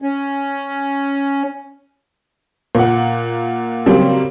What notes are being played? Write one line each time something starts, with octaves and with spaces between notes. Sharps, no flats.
C#4
A#2 F#5
C#3 F#3 G3 A#3 C4